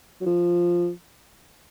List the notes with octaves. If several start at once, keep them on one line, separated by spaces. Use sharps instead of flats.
F#3
F3